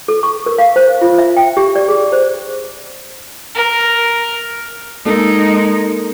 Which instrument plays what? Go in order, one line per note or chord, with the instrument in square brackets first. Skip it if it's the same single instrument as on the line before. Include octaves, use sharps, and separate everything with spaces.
[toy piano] A4
C#6
A#4
F5
C5
F4
E5
G5
G4
D5
G#4
C5
[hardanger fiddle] A#4
[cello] G#3 D#4 [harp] A#3 A4 A#4